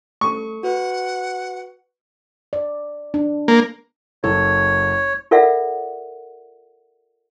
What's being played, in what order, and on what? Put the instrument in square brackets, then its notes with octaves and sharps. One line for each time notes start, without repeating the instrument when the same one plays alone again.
[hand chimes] A3 A4 [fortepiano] C#6
[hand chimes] F#4 B4 [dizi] F#5
[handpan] D5
D4
[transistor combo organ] A#3
[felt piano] F#1 A4 [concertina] C#5
[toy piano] F4 A4 A#4 D5 E5 F#5